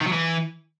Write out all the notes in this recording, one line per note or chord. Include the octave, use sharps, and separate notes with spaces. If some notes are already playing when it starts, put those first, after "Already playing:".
D#3
F#3
E3